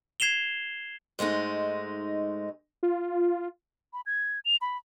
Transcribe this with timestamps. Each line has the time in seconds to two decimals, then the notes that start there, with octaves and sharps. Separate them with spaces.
0.20 G#6 C7 E7 F7 G7
1.19 G#2 G#3 A3 D#4
2.83 F4
3.93 B5
4.06 G#6
4.45 F7
4.62 B5